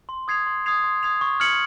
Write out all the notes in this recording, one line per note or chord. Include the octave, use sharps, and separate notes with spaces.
C6
D#6 G#6 C7 F7
C6
D#6 G#6 C7 F7
C6
D#6 G#6 C7 F7
C#6
F6 G#6 C#7 F#7